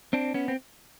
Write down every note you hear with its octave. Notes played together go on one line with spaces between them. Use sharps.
C4 D4
B3 C#4
C4